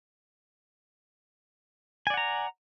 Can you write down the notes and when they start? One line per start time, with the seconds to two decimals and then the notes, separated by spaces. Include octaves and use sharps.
2.07 G#5
2.10 D5
2.14 F#5
2.17 A#5